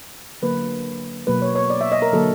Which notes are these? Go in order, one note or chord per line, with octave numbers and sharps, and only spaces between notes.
D3 F#3 A#3 B4
B2 F#3 A#3 B4
C#5
C#5
D5
E5
D#5
A#4
D3 F#3 A#3 A4